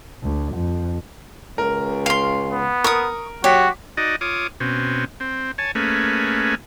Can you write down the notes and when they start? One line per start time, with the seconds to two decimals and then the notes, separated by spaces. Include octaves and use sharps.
0.23 D2
0.55 F2
1.58 C#2 A#4
2.06 F5 C6
2.52 B3
2.84 A#4 C#6 D#6
3.44 F#3 F#4 G4 C#5 B6
3.97 D#4 F#4 D5 D#5
4.21 F4 C#5 D6 D#6
4.60 B2 C4 C#4
5.20 C4
5.58 C#5 G#5 A5
5.75 A3 A#3 C#4 G#4 B4